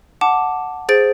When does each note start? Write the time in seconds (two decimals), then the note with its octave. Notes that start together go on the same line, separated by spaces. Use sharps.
0.21 F#5 A5 D6
0.89 G#4 C5 A6 D7